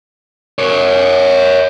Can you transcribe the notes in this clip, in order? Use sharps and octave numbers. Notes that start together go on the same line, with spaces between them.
A#4 C#5